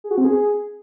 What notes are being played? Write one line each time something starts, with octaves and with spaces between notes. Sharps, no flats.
G#4
F#4
C4
G#4